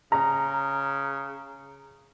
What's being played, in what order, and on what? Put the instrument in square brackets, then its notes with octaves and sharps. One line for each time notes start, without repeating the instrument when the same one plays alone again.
[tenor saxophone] C#3 [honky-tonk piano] A#5